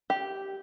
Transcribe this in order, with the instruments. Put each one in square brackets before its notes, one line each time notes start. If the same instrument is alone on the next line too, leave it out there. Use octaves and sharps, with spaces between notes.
[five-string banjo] G4